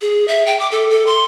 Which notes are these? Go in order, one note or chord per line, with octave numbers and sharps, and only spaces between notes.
G#4
E5
G5
D6
A4
A4
C6